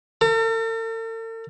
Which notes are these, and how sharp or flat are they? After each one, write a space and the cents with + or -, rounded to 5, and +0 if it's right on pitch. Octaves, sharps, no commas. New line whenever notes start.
A4 +45